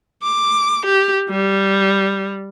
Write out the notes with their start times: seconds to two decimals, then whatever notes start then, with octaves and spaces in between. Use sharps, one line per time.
0.23 D6
0.86 G4
1.30 G3